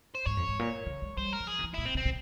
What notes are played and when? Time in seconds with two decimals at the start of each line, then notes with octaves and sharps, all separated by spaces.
0.15 C5
0.26 G#2 C#5
0.37 F2
0.48 G#2
0.59 A#2
0.86 C#3
1.02 G#3
1.17 G3 C5
1.33 A#4
1.40 F3
1.48 G#4
1.59 C#3
1.64 E3
1.74 A#2 E4
1.86 C4
1.95 C3
1.97 C4
2.05 C3